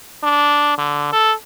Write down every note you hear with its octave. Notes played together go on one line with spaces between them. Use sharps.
D4
D3
A4